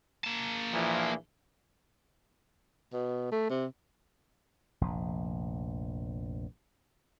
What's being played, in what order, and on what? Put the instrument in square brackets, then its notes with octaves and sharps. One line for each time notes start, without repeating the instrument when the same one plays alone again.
[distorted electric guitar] A#3 A5
[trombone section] A#1 E3 F3
[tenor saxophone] B2
A3
C3
[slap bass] F1 A#1